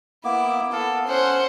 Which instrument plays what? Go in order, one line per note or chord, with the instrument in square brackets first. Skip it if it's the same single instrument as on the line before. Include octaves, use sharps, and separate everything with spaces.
[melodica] A#3 B3 D6 [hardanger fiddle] E4
[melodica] B3 F5 [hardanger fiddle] A4
[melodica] C#4 [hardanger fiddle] C5 F#5